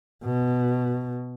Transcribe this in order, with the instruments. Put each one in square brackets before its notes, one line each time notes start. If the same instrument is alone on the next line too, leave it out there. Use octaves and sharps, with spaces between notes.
[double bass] B2